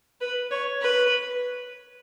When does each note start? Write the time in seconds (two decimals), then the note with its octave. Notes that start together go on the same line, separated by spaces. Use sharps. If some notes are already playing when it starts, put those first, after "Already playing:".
0.21 B4
0.51 C#5
0.82 B4